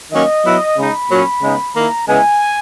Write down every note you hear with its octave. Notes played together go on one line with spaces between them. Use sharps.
D#3 F#3 A#3 C#4 D#5
F#3 B3 E4
C#3 G#3 D#4 B5
A#2 F#3 C#4
C#3 G#3 B3 D#4
D#3 A#3 E4 A#5
C#3 G#3 B3 E4 G#5